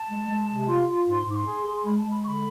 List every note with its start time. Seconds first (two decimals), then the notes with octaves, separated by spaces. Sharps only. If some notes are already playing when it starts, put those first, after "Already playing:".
Already playing: A5
0.09 G#3
0.28 G#3
0.48 C3
0.67 F4 C6
0.87 F4 C6
1.06 G#2 C6
1.25 G#2 D6
1.35 C6
1.45 G#4
1.65 G#4
1.76 C6
1.84 G#3 B5
1.97 A5
2.03 G#3
2.10 B5
2.23 D3 C#6
2.27 B5